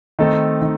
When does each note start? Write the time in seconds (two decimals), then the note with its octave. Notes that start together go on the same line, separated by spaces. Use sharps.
0.19 D#3 A3 C4 D#4 A4
0.62 D#3